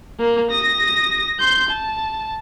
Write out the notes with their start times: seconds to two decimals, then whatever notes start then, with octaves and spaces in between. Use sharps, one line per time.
0.20 A#3 A#4
0.50 D#6 A#6
1.39 C6 G6
1.69 A5